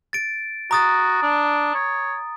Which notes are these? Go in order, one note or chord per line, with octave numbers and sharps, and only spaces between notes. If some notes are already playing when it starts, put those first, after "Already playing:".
A6 D7
F#4 A#5 D#6 A6
D4
C#5